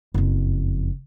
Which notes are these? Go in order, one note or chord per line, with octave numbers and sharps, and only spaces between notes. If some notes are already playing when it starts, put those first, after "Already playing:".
F#1 F2